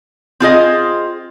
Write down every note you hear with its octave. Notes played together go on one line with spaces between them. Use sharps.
C4 F4 G#4 D#5